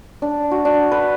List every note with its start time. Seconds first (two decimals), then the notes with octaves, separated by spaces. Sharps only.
0.22 D4
0.51 F#4
0.65 D4
0.91 B4